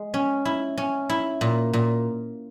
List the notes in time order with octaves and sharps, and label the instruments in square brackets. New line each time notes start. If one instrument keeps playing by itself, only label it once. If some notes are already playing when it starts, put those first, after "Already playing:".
Already playing: [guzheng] G#3
C#4
E4
C#4
E4
A#2
A#2